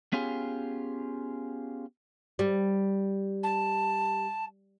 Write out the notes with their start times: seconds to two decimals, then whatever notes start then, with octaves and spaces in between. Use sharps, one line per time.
0.13 B3 C#4 F4 G4 G#4
2.39 G3
3.43 A5